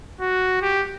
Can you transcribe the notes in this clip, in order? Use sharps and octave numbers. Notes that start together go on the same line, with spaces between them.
F#4
G4